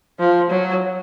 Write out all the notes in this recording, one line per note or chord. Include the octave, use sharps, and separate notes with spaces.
F3
F#3